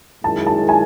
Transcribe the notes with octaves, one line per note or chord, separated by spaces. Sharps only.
F#2 D#3 G#3 C#4 E4 A5
A5
G#5